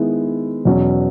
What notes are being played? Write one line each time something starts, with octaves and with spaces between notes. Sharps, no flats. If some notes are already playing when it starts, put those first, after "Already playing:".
Already playing: D#3 G#3 B3 E4
E2 B2 F#3 C#4